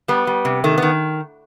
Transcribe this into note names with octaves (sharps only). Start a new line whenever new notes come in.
G3 B3
G3
C3
D#3 A3
D#3 B3